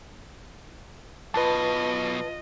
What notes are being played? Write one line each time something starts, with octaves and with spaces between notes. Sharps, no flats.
B1 B2 F4 B4 D#5 A5